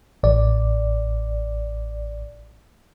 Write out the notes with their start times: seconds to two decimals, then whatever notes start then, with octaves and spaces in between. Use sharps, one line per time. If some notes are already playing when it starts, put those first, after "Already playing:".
0.23 A1 D5